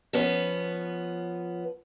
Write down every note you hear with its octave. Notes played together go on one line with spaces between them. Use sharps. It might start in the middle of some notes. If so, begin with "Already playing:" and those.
F3 B3 C#4 B4